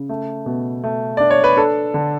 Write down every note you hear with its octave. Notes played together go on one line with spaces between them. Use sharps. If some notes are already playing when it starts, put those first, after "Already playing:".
Already playing: C#3
A3
B2
A3
D4 D5
C#5
B4
D4 A4
D3